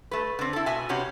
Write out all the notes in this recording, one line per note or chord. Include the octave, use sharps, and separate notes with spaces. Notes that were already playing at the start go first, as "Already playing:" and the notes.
A3 B4
D3 C4
E4 A4
B2 E5 G#5
C3 B3 C#4 F#4 G4